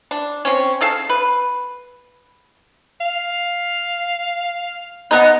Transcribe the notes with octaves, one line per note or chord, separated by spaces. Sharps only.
D4
C4 C#4
C#3 A4 F5 A5
B4
F5
B3 D#4